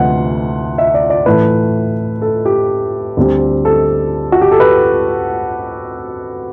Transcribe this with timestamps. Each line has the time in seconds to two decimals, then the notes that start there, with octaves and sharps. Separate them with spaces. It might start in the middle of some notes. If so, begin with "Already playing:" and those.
Already playing: D2 C3 E3 A3 F#5 C6
0.78 E5
0.94 D5
1.10 D5
1.26 A2 E3 A3 B4
2.22 A4
2.45 G4
3.17 D2 D3 G3 C4
3.65 A4
4.32 F#4
4.41 G4
4.52 A4
4.60 B4